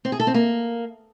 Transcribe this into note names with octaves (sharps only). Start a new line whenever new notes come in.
C4
G#4
A4
C4
A#3